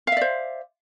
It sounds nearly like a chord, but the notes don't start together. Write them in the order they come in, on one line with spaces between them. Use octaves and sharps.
F5 E5 D5 C5